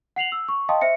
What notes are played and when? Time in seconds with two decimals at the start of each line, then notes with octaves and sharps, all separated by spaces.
0.16 F#5 C7 F7 F#7
0.32 E6
0.48 C#6
0.69 D#5 F5 G5 A5 C6 D#6
0.81 C5 E5 C#7